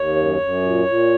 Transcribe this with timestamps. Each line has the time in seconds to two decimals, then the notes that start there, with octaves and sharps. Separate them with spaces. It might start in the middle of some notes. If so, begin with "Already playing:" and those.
Already playing: D#2 C#5
0.16 F#2
0.40 F#2
0.62 A#2
0.86 A#2